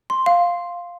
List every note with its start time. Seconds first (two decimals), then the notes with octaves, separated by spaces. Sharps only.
0.10 C6
0.26 F5